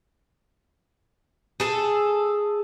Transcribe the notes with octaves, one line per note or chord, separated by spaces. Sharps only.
G#4 A4